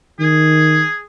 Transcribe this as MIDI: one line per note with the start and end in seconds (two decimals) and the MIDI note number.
0.20 0.84 51
0.20 1.01 68